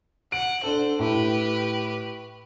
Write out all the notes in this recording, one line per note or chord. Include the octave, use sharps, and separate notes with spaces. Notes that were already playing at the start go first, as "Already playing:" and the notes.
F#5 D7
D4 A4 C5
A2 G4 B4